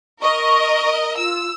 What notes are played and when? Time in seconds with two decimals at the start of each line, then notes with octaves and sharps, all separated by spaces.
0.22 A#4 D#5 C#6
1.18 F4 E6